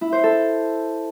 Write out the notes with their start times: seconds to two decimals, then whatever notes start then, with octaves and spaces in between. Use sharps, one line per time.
0.01 E4
0.12 C5
0.24 A4